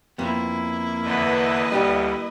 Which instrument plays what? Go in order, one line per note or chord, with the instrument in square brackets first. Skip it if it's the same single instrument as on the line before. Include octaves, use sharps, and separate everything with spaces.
[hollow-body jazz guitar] F2 B3 [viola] A#3 E4
[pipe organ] E2 D3 [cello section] B4 D#5
[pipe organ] D2 [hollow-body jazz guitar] G3 D4 G4